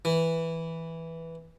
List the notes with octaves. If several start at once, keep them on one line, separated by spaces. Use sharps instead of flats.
E3